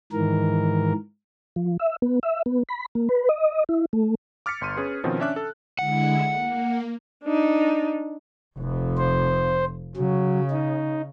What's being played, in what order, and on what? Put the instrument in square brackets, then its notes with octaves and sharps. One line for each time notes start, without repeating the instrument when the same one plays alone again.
[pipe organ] G#2 D#3 E3 A#4
[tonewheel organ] F3
E5
B3
E5
B3
B5
A#3
B4
D#5
E4
A3
[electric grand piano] D6 F6 A6 B6 C#7
G1 C6 D#7
C#4 G#4 B4
B2 D#3 F3 C4 C#4
C#4 D4 E5 D6 F#6
A4
[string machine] D3 G#3 E4 [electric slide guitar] F#5
[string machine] A#3
[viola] D4 D#4
[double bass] F1 F2
[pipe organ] C5
[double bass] C#3 [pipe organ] F#3
[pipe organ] D#4